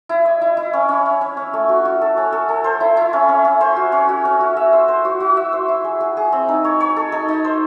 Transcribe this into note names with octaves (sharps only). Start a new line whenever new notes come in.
E4
D#5
E4
E4
C#4
C#4
C#4
C#4
C#4
A3
F#4
F#4
A4
C#4
A4
A4
C5
E4
E4
C#4
C#4
C#4
C5
F#4
C#4
F#4
C#4
F#4
E5
C5
C5
F#4
F#4
E5
C5
E4
G#4
G#4
G#4
C4
D#4
C#5
C#5
A4
D#4
D#4
C5